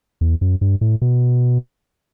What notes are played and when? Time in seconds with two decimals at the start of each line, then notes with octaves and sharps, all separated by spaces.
0.21 E2
0.41 F#2
0.61 G2
0.81 A2
1.02 B2